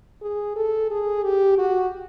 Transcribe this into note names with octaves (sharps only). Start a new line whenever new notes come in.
G#4
A4
G#4
G4
F#4